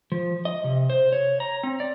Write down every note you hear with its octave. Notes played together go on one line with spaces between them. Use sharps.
F3
D#5
C3
C5
C#5
A#5
C4
D5